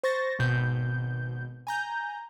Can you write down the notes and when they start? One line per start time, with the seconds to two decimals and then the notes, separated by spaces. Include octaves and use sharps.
0.03 C5 C#6 A6 A#6
0.39 G#1 B2 G6
1.67 G#5 A#5 G6